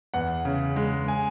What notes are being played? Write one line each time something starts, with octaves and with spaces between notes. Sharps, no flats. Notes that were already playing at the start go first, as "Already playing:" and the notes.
E2 F#5
C#3
G#3
G#5